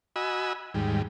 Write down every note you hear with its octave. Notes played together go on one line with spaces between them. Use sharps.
F#4 D#5 G#5 B5 E6
D#2 G#2 G3